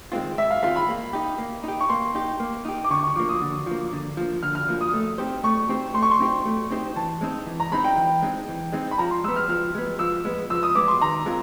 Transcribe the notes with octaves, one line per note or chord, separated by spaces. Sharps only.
D#3 G#3 C4 F4
G#2 E5
F5
D#3 G#3 C4 F4 F5
B5
A#3
D#4 G4
A#3
D#4 G4
C#6
A#3 C6
D#4 G4
A#3
D#4 G4
D6
D3 C#6
C#6
F3 A#3 D6
D#6
D3
F3 A#3
D3
F3 A#3
D3 F6
F6
F3 A#3
D#6
A3
C4 D#4 G4 C5
A3 C#6
C4 D#4 G4 C5
A3 C6
C#6
C6
C4 D#4 G4 C5
A3
C4 D#4 G4 C5
E3 A5
G#3 C4 D#4
E3
A#5
G#3 C4 D#4 B5
G5
E3
G#3 C4 D#4
E3
G#3 C4 D#4
B5
F3 A#5
C6
G#3 B3 E6
F6
F3 F6
G#3 B3
F3 E6
G#3 B3
F3 E6
D#6
G#3 B3 D6
C6
D#3 A#5
G#3 C4 F4 A#4